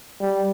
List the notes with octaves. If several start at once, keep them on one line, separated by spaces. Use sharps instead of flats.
G3